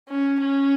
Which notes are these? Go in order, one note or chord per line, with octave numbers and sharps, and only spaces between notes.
C#4
C#4